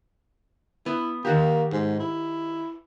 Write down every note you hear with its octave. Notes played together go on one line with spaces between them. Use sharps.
B3 E4
D#3 A#3 F#4 G4
G#2
E4